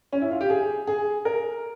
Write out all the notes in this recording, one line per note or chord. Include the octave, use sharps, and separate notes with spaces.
C#4
E4
F4
G4
G#4
G#4
A#4